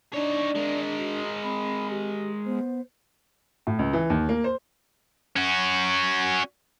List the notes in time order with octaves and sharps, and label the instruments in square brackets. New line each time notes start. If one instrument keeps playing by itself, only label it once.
[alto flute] D4 [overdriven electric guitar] D#4 C#5 [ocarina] D5
[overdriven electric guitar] G#3 A#4
[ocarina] F#4
[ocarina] C4 [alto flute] B5
[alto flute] G4
[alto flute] B3 [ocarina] C5
[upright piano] A2
C#2
E3
D#2
A#3
C5
[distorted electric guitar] C#4 F#4